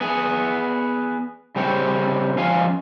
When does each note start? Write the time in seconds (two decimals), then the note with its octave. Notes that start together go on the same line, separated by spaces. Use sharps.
0.01 B3 G#4
1.56 C#3 G3 C4 C5 C#5
2.38 F3 C#4 F4 F5 G#5